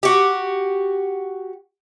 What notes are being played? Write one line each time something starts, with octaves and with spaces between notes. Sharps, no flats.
F#4 G4